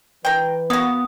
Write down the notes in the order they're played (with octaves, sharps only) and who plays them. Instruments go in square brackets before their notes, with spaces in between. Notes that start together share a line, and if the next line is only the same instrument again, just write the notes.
[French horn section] E3 B4 [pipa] A#4 G5
[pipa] A#3 F#4 [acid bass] B3 [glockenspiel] D#6